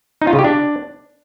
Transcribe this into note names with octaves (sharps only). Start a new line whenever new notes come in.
D#4
F4
C#3
G4
D4